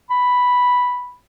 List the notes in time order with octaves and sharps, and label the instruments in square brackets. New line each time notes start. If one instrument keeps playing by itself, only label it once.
[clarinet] B5